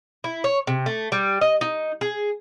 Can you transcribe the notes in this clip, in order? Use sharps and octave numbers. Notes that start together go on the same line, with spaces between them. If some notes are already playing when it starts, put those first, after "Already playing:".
E4
C#5
C3
A3
G3
D#5
D#4
G#4